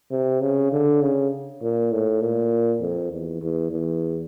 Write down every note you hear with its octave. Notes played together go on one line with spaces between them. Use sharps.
C3
C#3
D3
C#3
A#2
A2
A#2
F2
E2
E2
E2